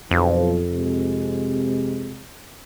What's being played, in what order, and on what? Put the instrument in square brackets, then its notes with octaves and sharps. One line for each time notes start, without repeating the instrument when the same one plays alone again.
[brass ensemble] B1 F3 [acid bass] F2
[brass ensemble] C3 G#3